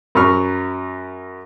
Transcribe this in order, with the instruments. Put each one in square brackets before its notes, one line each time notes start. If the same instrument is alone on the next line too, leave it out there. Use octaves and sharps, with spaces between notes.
[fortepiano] F#2 F#3 B5 C#6 F6